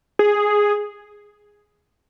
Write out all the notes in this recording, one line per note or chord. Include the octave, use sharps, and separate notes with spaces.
G#4